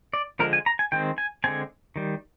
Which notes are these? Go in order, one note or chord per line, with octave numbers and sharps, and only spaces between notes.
D5
D3 F3 G#3 A#4
G#5
A#5
G#5
D#3 G#3 C4 G5
G#5
D3 G#3 C4 G#5
D#3 G3